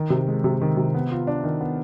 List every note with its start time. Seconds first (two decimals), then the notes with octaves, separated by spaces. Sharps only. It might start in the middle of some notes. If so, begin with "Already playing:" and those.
Already playing: D#3
0.10 C3
0.28 G#3
0.44 C3
0.62 D#3
0.77 C3
0.95 B3
1.11 F4
1.27 D4
1.44 D#3
1.61 B3